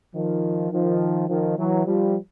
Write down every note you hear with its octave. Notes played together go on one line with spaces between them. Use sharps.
D#3 F3
D#3 F3
D#3 F3
E3 F#3
F3 G3